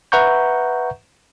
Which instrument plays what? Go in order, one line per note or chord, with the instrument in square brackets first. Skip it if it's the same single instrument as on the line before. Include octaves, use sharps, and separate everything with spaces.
[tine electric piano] B4 E5 F#5 A#5 C#6 G6